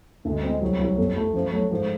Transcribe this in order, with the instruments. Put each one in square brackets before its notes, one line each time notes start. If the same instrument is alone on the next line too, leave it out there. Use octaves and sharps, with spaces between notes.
[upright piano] D2 [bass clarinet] A3
[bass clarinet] G#3
G3
[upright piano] C4
[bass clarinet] G#3
[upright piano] C2 [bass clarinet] F#3
[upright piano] C2
F2
A3
[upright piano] F#2 [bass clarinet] F3
[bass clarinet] F#3 [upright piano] A3
[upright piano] G#2 [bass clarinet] F3